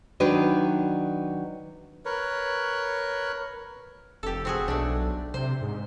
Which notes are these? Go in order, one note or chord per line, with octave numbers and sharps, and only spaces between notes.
D#3 F#3 D4 B4
A#4 B4 C#5
F1 G4 A4
C4 F#4 G#4
B1 A3 D4
C3 C5
G#2